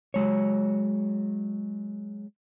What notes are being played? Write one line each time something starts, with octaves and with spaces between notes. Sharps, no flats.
F#3 G#3 C#5